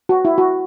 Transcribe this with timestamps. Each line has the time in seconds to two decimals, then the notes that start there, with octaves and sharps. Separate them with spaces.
0.09 F#4
0.25 E4
0.38 F#4